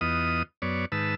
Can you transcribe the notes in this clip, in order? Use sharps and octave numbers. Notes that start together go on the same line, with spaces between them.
E2 B3 F4 D#5 D#6
F#2 B3 C#5 D5
G#2 D#3 B4 A5 E6